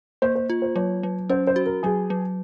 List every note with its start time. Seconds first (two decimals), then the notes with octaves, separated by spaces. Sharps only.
0.22 A#3 C5
0.35 C5
0.50 F4
0.62 C5
0.76 F#3 C#5
1.03 F#3
1.30 C#4 C5
1.47 C5
1.56 F#4
1.66 A#4
1.83 F#3 G#4
2.10 F#3